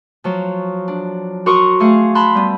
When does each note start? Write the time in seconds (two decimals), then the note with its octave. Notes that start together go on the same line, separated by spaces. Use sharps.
0.24 F3 F#3
0.88 D4
1.46 F#4 A#4 C6 C#6 D#6
1.80 A3 G#4 F5 F#5
2.15 A5 B5 C6 F#6
2.35 G3 B3